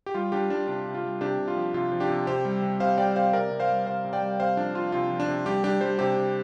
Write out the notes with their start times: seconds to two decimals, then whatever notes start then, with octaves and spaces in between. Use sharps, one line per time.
0.06 G4
0.14 G3 F4
0.32 G3 D4 G4
0.50 G3 D4
0.68 C3 D4
0.86 C3
0.94 F4
1.03 G3
1.21 C3 D4 G4
1.39 C3
1.48 F4
1.56 F3
1.74 C3 F4
1.92 F3
2.00 D4 G4
2.10 C3
2.27 C3 G4 C5
2.45 G3
2.62 C3
2.80 C3 C5 F5
2.98 G3 D5 G5
3.16 C3 C5 F5
3.33 C3 A#4 D5
3.51 C3
3.60 C5 F5
3.69 G3
3.86 C3 C5 F5
4.05 C3
4.13 D5 G5
4.22 G3
4.40 C3 C5 F5
4.57 F3 D4
4.75 F3 F4
4.92 C3 F4
5.10 F3
5.20 D4
5.28 C3
5.46 G3 D4 G4
5.63 G3 D4 G4
5.81 G3 G4 C5
5.99 C3 G4 C5
6.17 C3